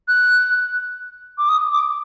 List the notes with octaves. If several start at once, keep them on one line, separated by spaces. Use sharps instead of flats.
F#6
D6
D#6
D6